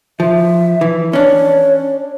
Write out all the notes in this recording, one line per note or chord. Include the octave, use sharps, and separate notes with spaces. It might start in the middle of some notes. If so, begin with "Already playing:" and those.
F3 E5
E3
C#4 D4 C#5